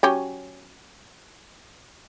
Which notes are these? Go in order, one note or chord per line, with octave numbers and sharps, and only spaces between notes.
F#3 C#4 G4